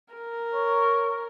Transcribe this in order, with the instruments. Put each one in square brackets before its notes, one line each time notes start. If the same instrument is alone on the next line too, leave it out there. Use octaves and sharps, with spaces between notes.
[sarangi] A#4
[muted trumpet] C#5